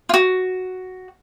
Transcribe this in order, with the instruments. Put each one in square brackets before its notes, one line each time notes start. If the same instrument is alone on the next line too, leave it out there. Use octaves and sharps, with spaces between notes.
[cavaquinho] F4 F#4